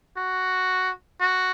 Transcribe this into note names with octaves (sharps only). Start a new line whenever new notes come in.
F#4
F#4